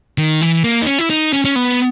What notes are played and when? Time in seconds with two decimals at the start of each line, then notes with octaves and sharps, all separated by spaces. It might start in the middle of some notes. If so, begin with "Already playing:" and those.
0.18 D#3
0.41 E3
0.64 A#3
0.82 D#4
0.87 C#4
0.99 E4
1.10 D#4
1.33 C#4
1.45 C#4
1.56 B3